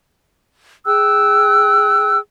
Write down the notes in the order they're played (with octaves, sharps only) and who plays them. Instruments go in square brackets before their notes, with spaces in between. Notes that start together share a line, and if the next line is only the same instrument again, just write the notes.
[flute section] G#4 G5 E6 F#6